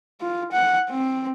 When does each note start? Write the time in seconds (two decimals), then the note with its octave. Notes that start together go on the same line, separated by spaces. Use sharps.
0.21 F4
0.52 F#5
0.90 C4